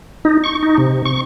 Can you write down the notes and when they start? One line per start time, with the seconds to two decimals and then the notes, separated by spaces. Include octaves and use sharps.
0.25 D#4
0.44 C#6
0.63 D#4
0.77 C3
1.05 C#6